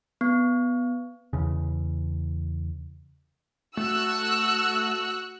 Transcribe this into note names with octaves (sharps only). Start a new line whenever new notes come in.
B3
E2 C#3
A3 F#4 E6 F#6